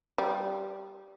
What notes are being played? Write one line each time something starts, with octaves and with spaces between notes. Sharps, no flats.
G3